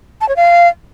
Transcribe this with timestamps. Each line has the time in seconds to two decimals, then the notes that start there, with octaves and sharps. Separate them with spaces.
0.21 A5
0.29 C#5
0.36 F5